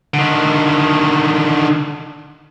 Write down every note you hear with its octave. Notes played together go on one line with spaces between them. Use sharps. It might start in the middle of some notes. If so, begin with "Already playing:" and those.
D3 D#3